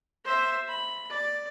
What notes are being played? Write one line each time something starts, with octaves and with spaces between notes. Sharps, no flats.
C5 E5
B5
D5